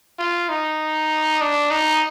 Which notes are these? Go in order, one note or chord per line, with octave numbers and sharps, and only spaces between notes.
F4
D#4
D4
D#4